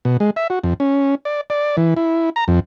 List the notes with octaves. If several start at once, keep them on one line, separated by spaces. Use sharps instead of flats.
B2
G#3
E5
F#4
F2
C#4
D5
D5
E3
E4
A#5
F2